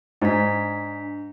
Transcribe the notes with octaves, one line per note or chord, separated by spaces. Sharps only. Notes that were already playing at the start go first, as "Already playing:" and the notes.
G#2 D4 B6